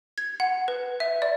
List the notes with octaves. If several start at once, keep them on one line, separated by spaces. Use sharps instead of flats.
G#6
F#5
B4
E5
D5